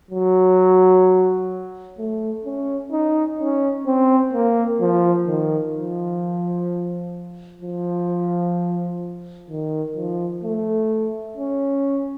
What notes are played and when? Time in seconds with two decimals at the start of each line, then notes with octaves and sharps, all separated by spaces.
0.10 F#3
1.98 A3
2.45 C#4
2.92 D#4
3.39 C#4
3.86 C4
4.33 A#3
4.80 F3
5.27 D#3
5.74 F3
7.62 F3
9.50 D#3
9.96 F3
10.44 A3
11.37 C#4